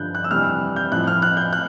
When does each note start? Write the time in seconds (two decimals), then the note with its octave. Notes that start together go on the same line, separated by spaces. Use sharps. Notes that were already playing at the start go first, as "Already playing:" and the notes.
Already playing: G2 D3 F3 F#6 G6
0.15 F#6
0.24 E6
0.31 F2 C3 E3 G3 F6
0.76 G6
0.91 A2 F3 F#6
1.07 F6
1.22 F#6
1.37 G6
1.53 F#6